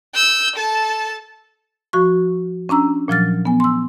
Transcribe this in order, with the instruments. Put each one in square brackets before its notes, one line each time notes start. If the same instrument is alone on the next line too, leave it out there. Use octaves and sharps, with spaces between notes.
[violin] E6 G6
A4 A5
[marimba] F3 F#4 C#6
C#4 D4 A#5 E6
A#2 F3 F#3 F6 A6
B3 G#5
C6 E6